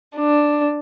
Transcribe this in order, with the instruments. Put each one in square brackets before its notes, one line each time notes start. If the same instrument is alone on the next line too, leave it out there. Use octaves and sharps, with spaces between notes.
[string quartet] D4